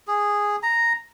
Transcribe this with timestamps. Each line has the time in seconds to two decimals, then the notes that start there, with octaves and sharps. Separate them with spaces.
0.08 G#4
0.63 A#5